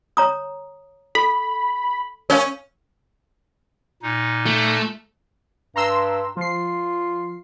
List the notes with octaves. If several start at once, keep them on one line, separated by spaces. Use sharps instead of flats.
C#5 A#5 D#6
A4 B5
C#4 A#4 C#5 F5
A#2 D#4
A3
G2 A#5 C6 E6
F3 F4 C7